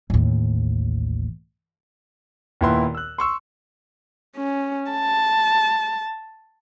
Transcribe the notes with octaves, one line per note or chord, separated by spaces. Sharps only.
A1 D#2
D#2 A#2 B3 E4 A#4 C6
E6 F#6
C6 C#6 E6
C#4
A5